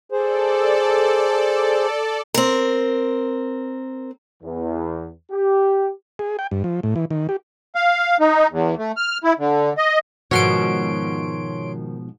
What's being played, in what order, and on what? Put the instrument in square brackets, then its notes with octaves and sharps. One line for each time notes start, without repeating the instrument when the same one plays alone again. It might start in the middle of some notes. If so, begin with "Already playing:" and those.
[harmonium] G#4 C5 [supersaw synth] A4 D5
[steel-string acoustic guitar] C4 A#4
[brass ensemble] E2
G4
[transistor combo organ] G#4
G5
G2
F3
A2
E3
D#3
G4
[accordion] F5
D#4
E2
A3
F6
E4
D3
D#5
[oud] G#2 B2 F3 [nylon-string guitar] D#3 F#4 [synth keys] C#5 C6 D7